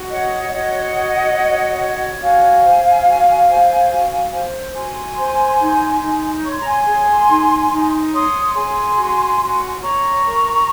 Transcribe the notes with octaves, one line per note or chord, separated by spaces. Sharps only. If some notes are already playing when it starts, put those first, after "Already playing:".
Already playing: F#4
C#5 D#5 F#5
F#4 D#5 F#5
C#5
F#4
C#5
F#4 F5 G#5
C5
F#4
C5
F#4
C5
F#4 G#5 C6
C5
D#4
D#4
C#5 C#6
C6
A#5
G#5 C6
G#4
D#4
D#4
C#5 C6 D#6
G#4 G#5 C6
F#4
F#4
C#5 A#5 C#6
A#4